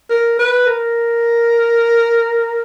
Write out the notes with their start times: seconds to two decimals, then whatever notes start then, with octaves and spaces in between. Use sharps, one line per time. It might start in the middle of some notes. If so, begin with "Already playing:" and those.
0.10 A#4
0.39 B4
0.66 A#4